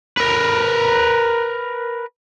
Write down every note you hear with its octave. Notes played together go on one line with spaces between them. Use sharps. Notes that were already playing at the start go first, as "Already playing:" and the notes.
A#4 B4